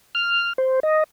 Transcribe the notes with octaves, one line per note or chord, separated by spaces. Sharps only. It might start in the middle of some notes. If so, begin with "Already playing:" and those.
F6
C5
D#5